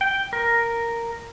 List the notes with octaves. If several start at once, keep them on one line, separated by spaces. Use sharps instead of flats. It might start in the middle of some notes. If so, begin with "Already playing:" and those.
G5
A#4